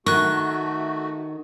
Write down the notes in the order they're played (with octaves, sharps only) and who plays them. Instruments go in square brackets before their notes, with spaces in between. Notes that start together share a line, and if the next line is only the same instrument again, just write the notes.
[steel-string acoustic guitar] D#3 [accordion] A3 F#4 [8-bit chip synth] C#6 F#6